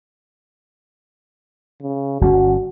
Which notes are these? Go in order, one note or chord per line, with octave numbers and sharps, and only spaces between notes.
C#3
G1 G3 C#4 F#4